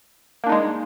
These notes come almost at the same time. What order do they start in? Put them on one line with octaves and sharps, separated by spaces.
A#3 D4 D#4 G#3